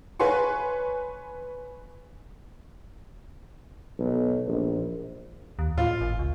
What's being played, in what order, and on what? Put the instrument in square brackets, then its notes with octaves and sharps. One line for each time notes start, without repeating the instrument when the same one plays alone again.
[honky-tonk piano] B4 C#5 G#5 C6 C#6
[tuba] B1
A#1
[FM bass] D#2
[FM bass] A2 [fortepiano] F4
[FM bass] G#1
C#2